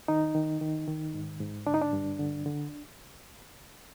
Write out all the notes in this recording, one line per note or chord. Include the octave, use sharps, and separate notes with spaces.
D#3 D#4
D#3
D#3
D#3
G#2
G#2
D3 D4
D#4
D4
G2
D3
D3